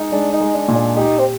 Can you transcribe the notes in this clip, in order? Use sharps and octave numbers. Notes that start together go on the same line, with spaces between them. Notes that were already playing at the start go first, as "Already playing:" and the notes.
Already playing: G#3 D#4
G#3 D4
D#4
G#3
D4
A#2
D4
D#4 G4
C4